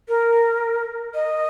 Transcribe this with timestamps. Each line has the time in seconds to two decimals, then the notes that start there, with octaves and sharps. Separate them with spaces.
0.08 A#4
1.14 D#5